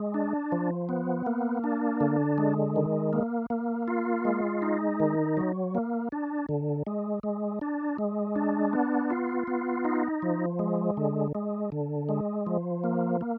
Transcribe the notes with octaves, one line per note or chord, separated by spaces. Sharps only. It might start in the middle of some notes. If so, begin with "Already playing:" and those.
Already playing: G#3
D4
F3
B3
A#3
D4
D3
G#3
D#3
A#3
A#3
F4
G#3
D#4
D#3
F#3
A#3
D4
D3
G#3
G#3
D4
G#3
D4
B3
F4
B3
D#4
F3
G#3
D3
G#3
D3
G#3
F3
A#3
A#3